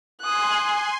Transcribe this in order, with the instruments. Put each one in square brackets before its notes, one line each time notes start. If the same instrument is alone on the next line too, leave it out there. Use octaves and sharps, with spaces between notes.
[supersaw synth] G#5 C6 [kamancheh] D#6 F#6